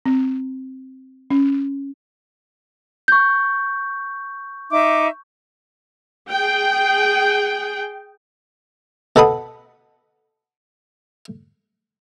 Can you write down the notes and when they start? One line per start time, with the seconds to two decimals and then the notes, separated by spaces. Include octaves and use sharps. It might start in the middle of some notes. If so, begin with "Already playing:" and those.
0.06 C4
1.30 C#4
3.08 C#6 G6
4.70 D#4 E5 D6
6.29 G#4 G5
9.16 B2 A4 F#5 B5 D#6